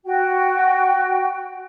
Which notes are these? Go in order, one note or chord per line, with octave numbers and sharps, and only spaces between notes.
F#4 G5